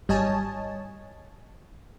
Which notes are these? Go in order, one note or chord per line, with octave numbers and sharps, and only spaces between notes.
G#1 G3 C#5 D#5 G#5 A5